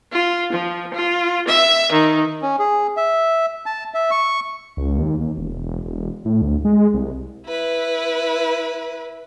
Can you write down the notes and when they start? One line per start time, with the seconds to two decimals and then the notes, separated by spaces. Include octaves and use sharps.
0.12 F4
0.51 F3
0.93 F4
1.47 E5
1.91 D#3
2.42 C#4
2.59 G#4
2.97 E5
3.66 A5
3.94 E5
4.11 C#6
4.77 C#2
4.98 D#2
5.21 D#2
5.38 E1
5.85 E1
6.25 A2
6.42 D2
6.65 G#3
6.94 C2
7.47 E4 B4